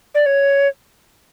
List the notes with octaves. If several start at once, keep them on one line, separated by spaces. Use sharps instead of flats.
D5
C#5